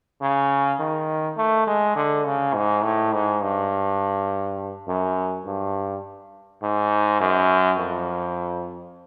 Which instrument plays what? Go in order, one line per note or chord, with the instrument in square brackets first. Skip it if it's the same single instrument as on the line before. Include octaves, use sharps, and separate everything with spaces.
[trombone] C#3
D#3
A3
G#3
D3
C#3
G#2
A2
G#2
G2
F#2
G2
G#2
F#2
F2